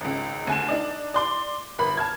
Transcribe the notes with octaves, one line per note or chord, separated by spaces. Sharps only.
G#1 C#2
D2 G#5 E7
D4 D#4 D5
D5 C6 D6
G1 A#4 B5
A5 F6 G#6